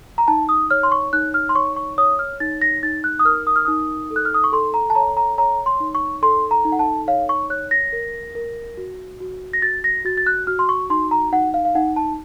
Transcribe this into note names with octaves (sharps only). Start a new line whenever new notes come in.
A#5
D#4 A5
D#6
C#5 F6
C6
C#6
D#4 F#6
F6
C6
C#5 C#6
C#6
C#5 D#6
F6
D#4 A6
A#6
D#4 A6
F#6
D#6
A#4 F6
D#6
F6
D#4 D#6
A4
F#6
F6
D#6
C#6
A4 C6
A#5
A5
C#5 A#5
A#5
C#5 A#5
C6
D#4
C#6
A4 C6
A#5
D#4
F#5
A5
C#5 F5
C#6
C#5 F#6
A#6
A#4
A#4
F#4
F#4
A#6
F#4 A6
A#6
F#4 A6
A6
F#6
F#4 F6
C6
C#6
D#4 C6
A#5
D#4 F#5
F5
F5
D#4 F#5
A5